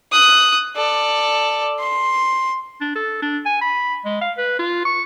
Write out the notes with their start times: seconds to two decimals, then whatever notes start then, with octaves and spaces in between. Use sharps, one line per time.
0.12 D#6 F#6
0.76 A4 D5
1.80 C6
2.81 D4
2.96 A4
3.22 D4
3.46 G#5
3.61 B5
4.05 G#3
4.21 F5
4.38 B4
4.59 F4
4.85 C#6